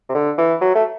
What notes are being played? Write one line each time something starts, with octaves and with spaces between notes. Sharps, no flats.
C3
D3
E3
F#3
A3